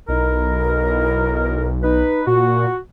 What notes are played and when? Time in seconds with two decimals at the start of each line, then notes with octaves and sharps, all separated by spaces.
0.08 B1 D#4 E4 A#4
1.83 D#4 B4
2.27 A#2 F#4